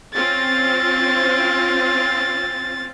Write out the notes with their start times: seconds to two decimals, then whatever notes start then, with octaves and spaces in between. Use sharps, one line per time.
0.14 C4 C#4 F4 A6